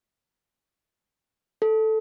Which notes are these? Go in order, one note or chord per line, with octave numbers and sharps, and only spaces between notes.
A4